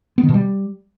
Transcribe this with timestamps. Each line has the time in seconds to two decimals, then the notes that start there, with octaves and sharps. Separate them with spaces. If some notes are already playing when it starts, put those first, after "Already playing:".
0.18 B3
0.23 D#3
0.29 B2
0.34 G3